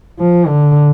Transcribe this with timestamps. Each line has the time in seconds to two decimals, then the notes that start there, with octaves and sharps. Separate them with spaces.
0.19 F3
0.47 D3